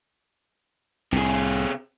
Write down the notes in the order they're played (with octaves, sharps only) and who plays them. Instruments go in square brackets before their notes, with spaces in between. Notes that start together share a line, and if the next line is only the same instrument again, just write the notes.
[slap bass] C2 A2 [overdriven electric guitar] C3 G#4